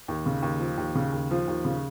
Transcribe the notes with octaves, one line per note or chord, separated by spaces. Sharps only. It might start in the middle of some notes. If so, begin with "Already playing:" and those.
D#2
C#3
D#2
F3
D#2
C#3
D#2
F3
D#2
C#3